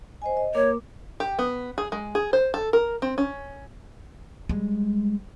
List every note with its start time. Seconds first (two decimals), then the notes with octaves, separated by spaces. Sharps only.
0.22 C5 D#5 G#5
0.37 D#5
0.55 A#3 A#4 C#5 D6
1.20 G4
1.39 B3
1.78 G#4
1.92 G#3
2.15 G#4
2.33 C5
2.54 A4
2.73 A#4
3.02 C4
3.18 C#4
4.49 G3 G#3